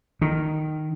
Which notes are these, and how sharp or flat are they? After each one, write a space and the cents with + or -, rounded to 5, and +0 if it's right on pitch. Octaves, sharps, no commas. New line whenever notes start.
D#3 -10